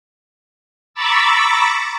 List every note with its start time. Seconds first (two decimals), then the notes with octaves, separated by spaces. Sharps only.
0.94 A#5 B5 C#6 D6 E6 A6